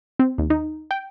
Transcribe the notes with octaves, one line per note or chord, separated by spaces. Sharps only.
C4
D#2
D#4
G5